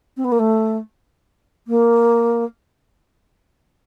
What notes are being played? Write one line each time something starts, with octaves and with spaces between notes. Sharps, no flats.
C4
B3
A#3
A3
A#3